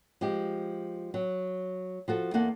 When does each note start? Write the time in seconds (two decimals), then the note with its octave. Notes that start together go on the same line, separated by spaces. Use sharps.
0.21 F3 G#3 G4
1.14 F#3
2.08 F3 F#4 A4
2.34 E2 A#3 A4 F#5